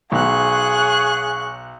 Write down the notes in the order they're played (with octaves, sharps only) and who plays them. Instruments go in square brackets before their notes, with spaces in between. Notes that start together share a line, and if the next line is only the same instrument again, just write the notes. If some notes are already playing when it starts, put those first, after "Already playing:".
[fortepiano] B1 [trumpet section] G#4 C#5 F5 [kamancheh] C#6 F#6